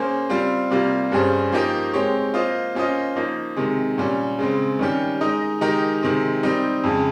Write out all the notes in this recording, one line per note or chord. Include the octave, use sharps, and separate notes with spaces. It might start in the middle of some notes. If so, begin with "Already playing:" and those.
Already playing: A#3 C#4 G#4 C5
G3 C4 F4
C3 G3 A#3 F4
G2 G3 C#4 G#4 C5
F3 A#3 D#4 G4 A#4
G#3 C4 G4 C#5
A#3 F4 C5 D#5
A#3 C#4 F4 C5 D#5
F3 A#3 D#4
C3 D#3 G#3
A#2 G3 C#4
C#3 G#3 C4
D#3 G3 C#4 G4
G#3 D#4 A#4 D#5
D#3 G#3 D#4 G4 A#4
C3 D#3 G#3 C4
G3 C4 D#4 G4
F2 C#3 G#3